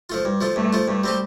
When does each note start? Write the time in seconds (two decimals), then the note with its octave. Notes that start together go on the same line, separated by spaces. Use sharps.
0.09 F3 A3 F4
0.25 G2
0.41 F3 A3 F4
0.56 G2 A3
0.73 F3 A3 F4
0.88 G2 A3
1.04 G3 C4 G4